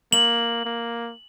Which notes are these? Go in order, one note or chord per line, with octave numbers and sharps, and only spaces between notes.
A#3 F#7
A#3